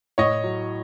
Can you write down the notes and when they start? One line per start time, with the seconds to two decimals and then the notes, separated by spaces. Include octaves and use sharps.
0.18 A2 C#5 D#5
0.44 F#3